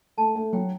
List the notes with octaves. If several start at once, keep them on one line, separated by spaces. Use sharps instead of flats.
A3 A5
A3
F#3 G5